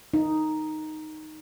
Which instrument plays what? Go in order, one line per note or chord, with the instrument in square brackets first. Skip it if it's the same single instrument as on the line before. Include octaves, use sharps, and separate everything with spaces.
[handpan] D#4